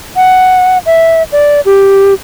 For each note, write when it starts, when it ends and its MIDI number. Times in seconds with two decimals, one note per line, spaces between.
0.16 0.78 78
0.86 1.23 76
1.32 1.61 74
1.66 2.14 67